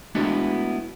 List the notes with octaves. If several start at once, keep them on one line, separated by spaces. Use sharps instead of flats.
G#3 A3 B3 D4 E4 F#4